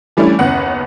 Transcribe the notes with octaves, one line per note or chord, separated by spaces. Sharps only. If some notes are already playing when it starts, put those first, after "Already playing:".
E3 G3 A3 C#4 D4 E4
F#1 D#2 B3 C#4 F#5